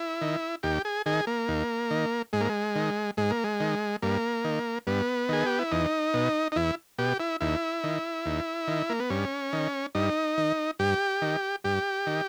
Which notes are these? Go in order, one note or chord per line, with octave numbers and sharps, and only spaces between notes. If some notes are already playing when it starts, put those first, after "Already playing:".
Already playing: E4
D#3
D#2 G4
G#4
D#3 G#4
A#3
D#2
D#3
G#2 G#3
A#3
G#3
D#3
G#2 G#3
A#3
G#3
D#3
G2 A#3
D#3
G2 B3
D#3 G#4
G4
E4
E2 D#4
B2
D#4
E2 E4
B2 G4
E4
D#2 E4
D#3
D#2
D#3
A#3
B3
G2 C#4
D#3
G2 D#4
D#3
G2 G4
D#3
G2 G4
D#3